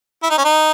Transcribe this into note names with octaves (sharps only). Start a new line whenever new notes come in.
E4
D#4
C#4
D#4